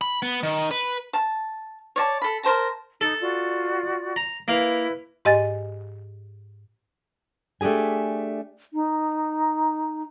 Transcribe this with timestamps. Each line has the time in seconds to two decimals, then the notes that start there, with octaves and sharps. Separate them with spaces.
0.01 B5
0.23 B3
0.43 D#3
0.71 B4
1.13 A5
1.96 C#5 D5 A5
2.22 A4 B5
2.43 A#4 C5 A5 A#5
3.01 D#4 A4
3.21 F4 F#4 D5
4.16 A#5
4.48 A#3 E4 B4 F5
5.25 G#2 G4 D#5 G#5 A6
7.61 A3 D4 G4 G#4 G#5
8.73 D#4